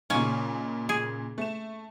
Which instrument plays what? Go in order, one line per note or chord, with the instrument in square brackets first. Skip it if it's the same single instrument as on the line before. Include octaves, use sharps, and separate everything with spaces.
[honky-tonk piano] A#2 C#3 D#4 [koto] A#3 C#4
[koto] G#4
[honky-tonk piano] A3 E7